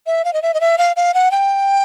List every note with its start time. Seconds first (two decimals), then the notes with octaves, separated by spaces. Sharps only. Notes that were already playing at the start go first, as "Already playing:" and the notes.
0.06 E5
0.25 F5
0.33 D#5
0.42 E5
0.54 D#5
0.61 E5
0.78 F5
0.96 F5
1.14 F#5
1.31 G5